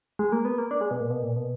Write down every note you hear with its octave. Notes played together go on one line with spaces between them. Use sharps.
G#3
A#3
B3
A#3
D4
G#3
B2
A#2
B2
A#2
B2